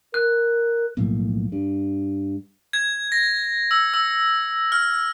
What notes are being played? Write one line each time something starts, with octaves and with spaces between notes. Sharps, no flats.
A#4 F#6
B1 A2 F3 A#3
G2
G#6
A#6
E6
E6
F6